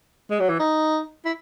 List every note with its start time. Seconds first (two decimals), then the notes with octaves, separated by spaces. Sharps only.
0.31 G#3
0.40 F#3
0.49 E3
0.59 D#4
1.25 E4